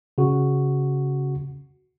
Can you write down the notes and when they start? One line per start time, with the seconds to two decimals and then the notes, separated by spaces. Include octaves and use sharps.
0.18 C#3 F#4